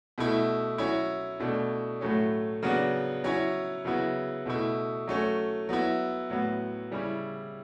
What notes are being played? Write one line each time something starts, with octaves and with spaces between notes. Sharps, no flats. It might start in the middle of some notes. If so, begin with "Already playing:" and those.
B2 A3 E4
F#3 C#4 E4
B2 A3 D4
A2 F#3 A3 C#4
C#3 F#3 B3 D4
F#3 C#4 E4
C#3 F#3 B3 E4
B2 A3 E4
F#3 A3 C#4
F#3 B3 E4
A2 F#3 B3
C#3 G3 C#4 E4